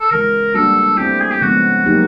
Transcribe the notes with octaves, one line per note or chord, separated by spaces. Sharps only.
A4
C#3 E3 G#3 A#4
G3 A#3 D4 F#4 A4
A3 C4 E4 G4
G#4
G4
C#3 F3 G#3 B3 F#4
F#3 A#3 D#4 G4